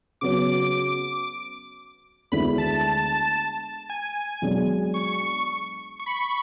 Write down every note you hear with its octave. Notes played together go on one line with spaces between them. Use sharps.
C#3 F#3 B3 F#4 C#5 D6
D2 D3 G#3 B3 E4 B5
A5
G#5
B1 B2 G#3 D4
C#6
C#6
B5
C#6
C#6